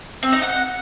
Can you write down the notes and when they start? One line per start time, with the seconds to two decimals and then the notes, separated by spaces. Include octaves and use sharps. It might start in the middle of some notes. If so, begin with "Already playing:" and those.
0.23 C4
0.32 D#4
0.42 F#5